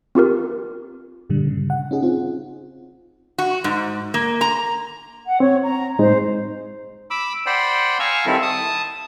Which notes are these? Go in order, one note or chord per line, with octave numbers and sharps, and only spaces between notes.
C4 F4 G4 A#4
G2 A#2 D3 G3
C#3
F#5
C#4 D#4 G#4
C4 F4
F#4
G#2
A#3
A#5
F#5
C4 C#5
A#5
A2 G#3 D#4 C5
B5 D6 E6
C5 D5 F#5 G5 B5 C6
F5 G#5 A#5 C#6 E6
D#3 G3 C4 E4 A4
A5 D#6